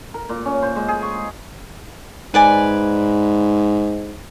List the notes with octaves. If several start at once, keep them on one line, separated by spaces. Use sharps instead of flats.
A#4
A#2
C#4
C5
G#3
G#4
C#6
G#2 B4 D5 G#5